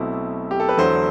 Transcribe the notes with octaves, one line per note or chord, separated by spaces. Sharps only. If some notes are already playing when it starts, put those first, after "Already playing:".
Already playing: B1 B2 A3 C4 E4
G4
A4
B4
E2 D3 F#3 A3 E4 C5